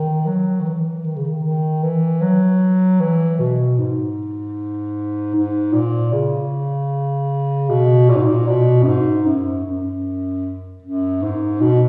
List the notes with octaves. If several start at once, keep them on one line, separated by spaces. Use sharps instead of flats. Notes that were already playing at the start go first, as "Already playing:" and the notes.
Already playing: D#3
F#3
D#3
E3
D#3
C#3
D#3
D#3
E3
F#3
E3
B2
G#2
G#2
A#2
C#3
B2
A#2
G#2
A#2
B2
F#2
G#2
F#2
F#2
F#2
G#2
B2